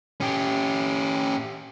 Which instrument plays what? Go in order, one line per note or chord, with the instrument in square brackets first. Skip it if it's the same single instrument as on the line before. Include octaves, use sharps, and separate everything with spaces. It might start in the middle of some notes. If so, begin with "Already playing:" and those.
[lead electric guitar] C#4 G4